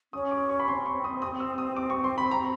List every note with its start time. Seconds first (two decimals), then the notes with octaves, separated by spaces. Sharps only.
0.13 C#4 D#6
0.31 D6
0.49 C#6
0.60 B5
0.68 C4 C6
0.86 C#6
1.04 D#6
1.22 D#6
1.40 E6
1.58 D#6
1.76 D6
1.90 C#6
2.04 C6
2.18 B5
2.31 A#5